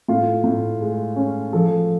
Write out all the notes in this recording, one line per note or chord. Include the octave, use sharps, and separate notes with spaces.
A2 F4
A2
G#3
C#4
F3 A4